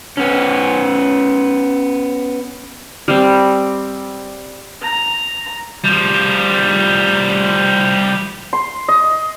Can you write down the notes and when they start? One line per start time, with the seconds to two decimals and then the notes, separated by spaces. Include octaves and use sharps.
0.17 B3 C#4
3.08 G3 C4
4.82 A#5
5.85 F3 G3
8.53 C6
8.88 D#5